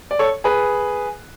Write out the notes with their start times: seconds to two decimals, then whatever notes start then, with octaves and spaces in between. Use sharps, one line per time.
0.11 D5
0.19 A4 C#5
0.44 G#4 B4